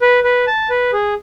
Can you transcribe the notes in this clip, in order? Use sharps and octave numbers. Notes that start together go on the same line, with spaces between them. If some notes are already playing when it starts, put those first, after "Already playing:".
B4
B4
A5
B4
G#4